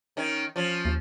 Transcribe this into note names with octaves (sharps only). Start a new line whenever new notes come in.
D#3 C#4
F3 C#4
D#2